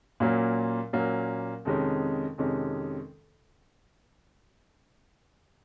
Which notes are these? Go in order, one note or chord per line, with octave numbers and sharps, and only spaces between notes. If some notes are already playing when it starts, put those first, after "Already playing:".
A#2 F#3 A#3 C#4
A#2 F#3 A#3 C#4
F2 C3 D#3 G#3 C#4
F2 C3 D#3 G#3 C#4